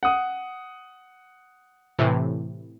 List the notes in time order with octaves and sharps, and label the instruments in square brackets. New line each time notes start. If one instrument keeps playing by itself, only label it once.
[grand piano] F#5 D#6
[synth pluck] A2 C3 E3